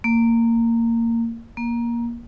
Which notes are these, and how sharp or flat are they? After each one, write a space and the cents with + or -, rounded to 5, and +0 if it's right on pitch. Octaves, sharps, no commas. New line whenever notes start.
A#3 -20
A#3 +15